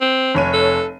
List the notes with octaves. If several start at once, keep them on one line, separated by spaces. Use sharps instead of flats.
C4
F1 C#5 D#7
A4